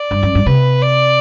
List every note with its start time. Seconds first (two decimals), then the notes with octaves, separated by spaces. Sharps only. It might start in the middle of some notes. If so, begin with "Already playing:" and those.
Already playing: D5
0.11 G2
0.23 F#2
0.35 G2
0.46 C3 B4
0.82 D5